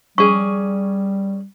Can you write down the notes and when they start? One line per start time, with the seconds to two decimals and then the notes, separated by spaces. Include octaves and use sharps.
0.18 G3 C#4 G#4 D5 C#6